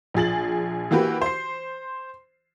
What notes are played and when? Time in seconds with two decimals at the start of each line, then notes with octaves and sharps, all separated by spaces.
0.14 A#1 F3 G#4 A6 F#7
0.91 E3 A#3 F#4 G4 B4
1.22 C5 C7